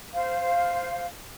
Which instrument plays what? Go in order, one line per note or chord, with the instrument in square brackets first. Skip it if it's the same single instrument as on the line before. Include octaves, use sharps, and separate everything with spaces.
[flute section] C5 F5